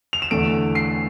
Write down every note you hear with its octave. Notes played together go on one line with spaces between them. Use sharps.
F7
E7
E2 D3 A3 D7
C7